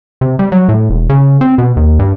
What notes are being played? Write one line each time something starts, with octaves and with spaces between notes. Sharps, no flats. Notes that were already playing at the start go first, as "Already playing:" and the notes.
C3
G3
F#3
A2
E1
C#3
C4
B2
D#2
G2